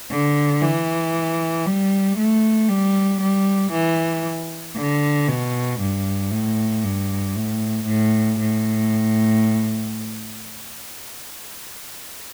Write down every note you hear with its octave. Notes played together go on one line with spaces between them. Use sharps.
D3
E3
G3
A3
G3
G3
E3
D3
B2
G2
A2
G2
A2
A2
A2